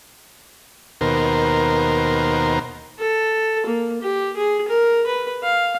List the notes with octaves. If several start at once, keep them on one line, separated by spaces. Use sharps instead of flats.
D#2 B2 A#4 C5
A4
A#3
G4
G#4
A#4
B4
F5